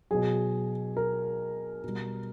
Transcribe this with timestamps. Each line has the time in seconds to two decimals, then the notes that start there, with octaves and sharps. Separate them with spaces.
0.11 B2 F#3 G#4
0.97 A#4
1.84 B2 G3